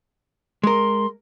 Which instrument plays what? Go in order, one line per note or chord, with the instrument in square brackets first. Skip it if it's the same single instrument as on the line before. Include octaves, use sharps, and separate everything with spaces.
[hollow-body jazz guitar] G#3 A#4 [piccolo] C6